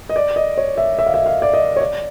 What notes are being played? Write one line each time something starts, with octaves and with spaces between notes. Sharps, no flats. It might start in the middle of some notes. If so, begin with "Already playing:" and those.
D#5
D5
D#5
C#5
E5
E5
F5
E5
F5
D5
D#5
C#5
D5